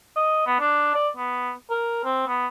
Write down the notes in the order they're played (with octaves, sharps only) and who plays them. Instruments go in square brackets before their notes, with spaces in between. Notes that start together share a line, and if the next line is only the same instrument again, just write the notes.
[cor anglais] D#5
B3
D4
D5
B3
A#4
C4
B3